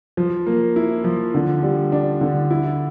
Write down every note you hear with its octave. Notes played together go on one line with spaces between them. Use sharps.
F3
A#3
E4
F3
D3
G3
D4
D3
E4